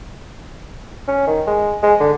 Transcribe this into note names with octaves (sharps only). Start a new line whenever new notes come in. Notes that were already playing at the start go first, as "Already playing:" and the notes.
C#4
D#3
G#3
G#3
D3